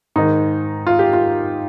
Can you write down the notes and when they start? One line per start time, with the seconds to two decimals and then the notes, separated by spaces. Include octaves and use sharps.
0.16 G#2 D#3 D#4
0.87 F4
0.99 G4
1.13 F4